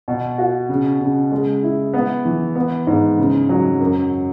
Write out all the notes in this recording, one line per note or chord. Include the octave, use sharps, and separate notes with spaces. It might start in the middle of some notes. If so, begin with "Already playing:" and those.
B2
F#4
C#3
C#3
G#3
E4
B3
E3
B3
G#2
C#3
F#3
F#2